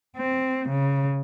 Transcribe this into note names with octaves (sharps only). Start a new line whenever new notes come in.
C4
C#3